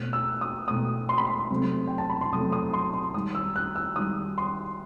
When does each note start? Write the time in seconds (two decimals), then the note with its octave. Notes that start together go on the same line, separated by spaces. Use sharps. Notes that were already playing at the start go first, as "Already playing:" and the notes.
Already playing: B2 A3 F#6
0.13 E6
0.41 D#6
0.68 B2 A3 D#6
1.09 C6
1.18 B5
1.27 C6
1.50 C3 F#3 A3
1.88 G5
1.98 A5
2.10 B5
2.21 C6
2.33 C3 F#3 A3 D#6
2.52 D#6
2.73 C6
2.94 C6
3.14 D#3 G3 D#6
3.35 E6
3.56 F#6
3.76 E6
3.96 D#3 G3 D#6
4.38 C6